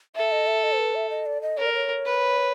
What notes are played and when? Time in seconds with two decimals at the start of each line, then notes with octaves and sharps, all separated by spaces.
0.16 A4 E5
0.32 D#5
0.47 E5
0.63 D#5
0.73 C5
0.78 B4
0.95 E5
1.10 D#5
1.26 D5
1.42 D#5
1.57 A#4 C#5
1.66 D5
1.74 C#5
2.05 B4